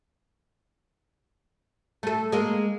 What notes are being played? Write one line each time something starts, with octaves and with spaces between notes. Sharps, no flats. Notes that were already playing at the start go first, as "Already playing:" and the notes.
A3 A4
G#3 A#3